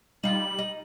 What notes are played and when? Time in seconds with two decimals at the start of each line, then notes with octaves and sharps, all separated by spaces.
0.23 G3 D#4 F4 F#7
0.59 D#4